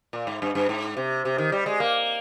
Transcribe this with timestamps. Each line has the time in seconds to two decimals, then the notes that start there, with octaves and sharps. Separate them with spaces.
0.13 A#2
0.27 G#2
0.42 G2
0.55 G2
0.69 G#2
0.97 C3
1.25 C3
1.38 D#3
1.52 G3
1.66 G#3
1.80 A#3